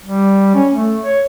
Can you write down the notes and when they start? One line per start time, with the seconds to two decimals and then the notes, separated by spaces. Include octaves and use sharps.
0.04 G3
0.54 C#4
0.72 A3
1.03 C#5